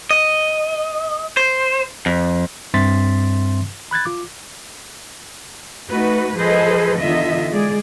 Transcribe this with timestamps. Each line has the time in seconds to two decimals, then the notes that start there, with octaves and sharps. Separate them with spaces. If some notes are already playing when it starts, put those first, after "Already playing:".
0.11 D#5
1.37 C5
2.06 F2
2.74 G2 C4 E5 C6 A6 B6
3.91 B5 F#6 G#6 A6
4.06 F4 D6
5.90 A3 D#4 F#4 B4
6.37 F3 G#4 A4 B4 C5 D#5
7.00 E2 D3 D#3 F4 D#5 E5
7.51 G#3 G#4 D5